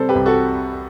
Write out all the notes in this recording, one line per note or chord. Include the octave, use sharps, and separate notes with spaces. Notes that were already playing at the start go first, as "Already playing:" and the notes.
Already playing: C3 G3 A4 C5
G4 B4
C2
F#4 A4